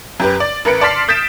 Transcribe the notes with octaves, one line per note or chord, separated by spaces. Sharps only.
F#2 G4 B4
D5
A1 A#4 B4 C#7 D7
D5 A5 C6 F6 B6 C7
D#6 G6 A6 B6 D7 E7